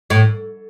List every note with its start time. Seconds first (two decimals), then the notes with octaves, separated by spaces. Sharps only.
0.10 A2